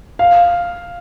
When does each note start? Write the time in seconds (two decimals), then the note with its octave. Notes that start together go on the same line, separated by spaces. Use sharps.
0.19 F5